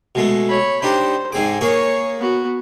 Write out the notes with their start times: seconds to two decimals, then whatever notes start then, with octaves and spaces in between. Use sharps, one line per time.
0.15 B2 G#3 A3
0.49 C#5 B5
0.82 D4 D#4 G4 C5
1.33 G#2 C4 G#4 G#5 D6
1.61 A#3 G#4 C#5 C#6
2.19 B3 F#4